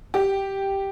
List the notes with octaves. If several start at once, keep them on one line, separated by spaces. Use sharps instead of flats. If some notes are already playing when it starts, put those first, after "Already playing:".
G4